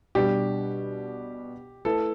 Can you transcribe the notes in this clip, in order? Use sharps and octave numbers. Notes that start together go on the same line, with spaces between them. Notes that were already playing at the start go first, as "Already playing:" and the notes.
B2 G3 D4 G4
A3 E4 A4 B4